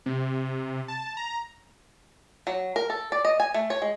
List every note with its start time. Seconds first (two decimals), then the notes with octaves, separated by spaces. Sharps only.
0.06 C3
0.88 A5
1.17 A#5
2.47 F#3
2.76 A#4
2.90 A4
3.12 D5
3.25 D#5
3.40 G#5
3.54 A3
3.70 C#5
3.82 G#3